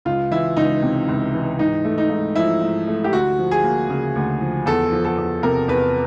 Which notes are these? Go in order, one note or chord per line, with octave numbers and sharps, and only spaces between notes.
C#2 F4
E3 E4
C#2 D#4
C3
C#2
E3
G#2 D#4
A3
D#4
G#2
F3 E4
G#2
A3
G4
D2 F#4
F3
G#4
A#3
C#3
D2
F3
E2 A4
F3
A4
E2
C3 A#4
E2 B4